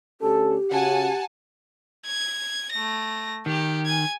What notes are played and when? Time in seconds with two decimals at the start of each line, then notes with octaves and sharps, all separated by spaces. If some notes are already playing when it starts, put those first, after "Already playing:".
0.21 D2 C#4 G4 A4
0.72 C#3 C#4 F#4 F#5 G#5 A5
2.06 G#6
2.72 A3 A#6
3.46 D#3 G4
3.86 G#5 G#6